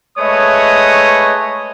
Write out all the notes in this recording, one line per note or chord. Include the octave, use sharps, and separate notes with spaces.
G#3 A3 B4 C#5 D#5 D#6